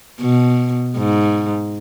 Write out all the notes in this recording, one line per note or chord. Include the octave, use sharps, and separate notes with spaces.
B2
G#2